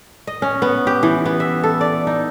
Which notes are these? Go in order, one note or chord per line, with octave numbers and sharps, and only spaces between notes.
D#5
C#4
B3
G4
E3
B3
E5
A4
D5
D#4